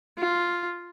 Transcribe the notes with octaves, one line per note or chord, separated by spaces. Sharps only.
F4